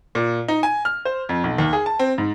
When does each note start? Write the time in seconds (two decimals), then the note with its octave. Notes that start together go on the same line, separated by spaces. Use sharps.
0.15 A#2
0.48 D#4
0.63 G#5
0.85 F6
1.05 C5
1.29 F2
1.44 B1
1.58 D#2
1.73 G#4
1.86 A5
1.99 C4
2.18 G#2